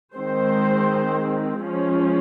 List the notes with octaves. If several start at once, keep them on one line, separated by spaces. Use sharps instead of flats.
D#3 G#3 C4 C5
F3 G#3 C#4